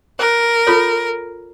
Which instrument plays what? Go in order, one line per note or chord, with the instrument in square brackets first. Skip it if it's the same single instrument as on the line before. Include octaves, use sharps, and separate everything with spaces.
[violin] A#4 [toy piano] C5
[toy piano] F4 A4 C#5